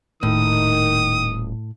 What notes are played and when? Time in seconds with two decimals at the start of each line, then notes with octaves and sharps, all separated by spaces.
0.23 D#1 A2 D#3 D#6